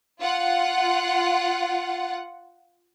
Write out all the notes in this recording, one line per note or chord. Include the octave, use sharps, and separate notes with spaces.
F4 F#5